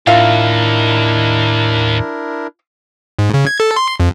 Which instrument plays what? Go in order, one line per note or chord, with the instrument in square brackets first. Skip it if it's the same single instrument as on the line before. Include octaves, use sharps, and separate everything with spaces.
[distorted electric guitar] D#2 [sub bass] A2 [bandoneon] D4 E4 A#4 [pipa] F4 E5 F5
[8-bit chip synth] G#2
C#3
G#6
A4
C6
F2